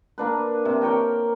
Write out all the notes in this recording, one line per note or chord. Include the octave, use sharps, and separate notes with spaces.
A#3 D4 B4
C3
A#4 C#5 G5 A#5